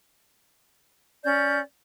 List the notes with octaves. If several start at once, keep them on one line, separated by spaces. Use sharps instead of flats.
C#4 D5 G6